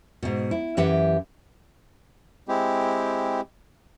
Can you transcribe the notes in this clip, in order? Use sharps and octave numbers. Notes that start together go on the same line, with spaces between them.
G#2 B2
E4
F#2 E3 G4 E5 F#5
G#3 C4 E4 G4